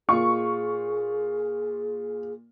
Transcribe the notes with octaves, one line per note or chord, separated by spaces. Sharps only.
A#2 F4 G#4 C#6